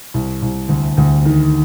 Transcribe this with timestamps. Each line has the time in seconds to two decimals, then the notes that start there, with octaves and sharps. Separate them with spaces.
0.14 C2
0.42 C2
0.69 D2
0.97 D2
1.25 D#3